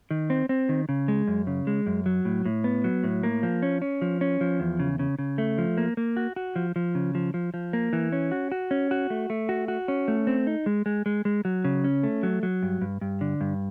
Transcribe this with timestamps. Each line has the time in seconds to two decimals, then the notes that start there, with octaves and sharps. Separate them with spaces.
0.11 D#3
0.30 C4
0.49 C4
0.69 D#3
0.89 C#3
1.08 G#3
1.27 F#2
1.47 C#3
1.67 G#3
1.86 F#2
2.06 F#3
2.25 A2
2.46 A2
2.64 B3
2.84 F#3
3.04 A2
3.23 A#3
3.43 F3
3.62 C#4
3.82 C#4
4.02 F3
4.21 C#4
4.41 F3
4.60 E2
4.80 C#3
4.99 C#3
5.19 C#3
5.38 A3
5.58 F3
5.77 A#3
5.97 A#3
6.17 F#4
6.36 F#4
6.56 F3
6.76 F3
6.95 C#3
7.15 F3
7.34 F3
7.54 F3
7.73 A#3
7.93 E3
8.12 C#4
8.32 F#4
8.52 F#4
8.71 C#4
8.91 F#4
9.10 A3
9.30 A3
9.49 F#4
9.68 F#4
9.88 C#4
10.08 A3
10.27 C4
10.47 D#4
10.66 G#3
10.86 G#3
11.06 G#3
11.25 G#3
11.45 F#3
11.64 C#3
11.84 C#4
12.03 A3
12.23 F#3
12.43 F#3
12.63 G2
12.81 G2
13.01 G2
13.21 D3
13.41 G2